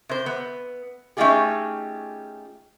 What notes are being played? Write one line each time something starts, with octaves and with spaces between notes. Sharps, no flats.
C3 C5
B3
A3 C#4 D#4 F4 G4 G#4